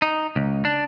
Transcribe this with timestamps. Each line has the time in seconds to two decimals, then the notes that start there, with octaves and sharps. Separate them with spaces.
0.02 D#4
0.36 C#2
0.65 D4